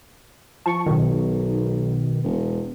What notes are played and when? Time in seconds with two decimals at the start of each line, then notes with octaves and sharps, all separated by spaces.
0.66 F3 A5 C#6
0.86 B1 B2 D#3
2.24 E1